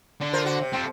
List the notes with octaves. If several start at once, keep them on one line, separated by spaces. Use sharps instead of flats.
D3
F4 A#4 C5
F#4
C3
C4 A4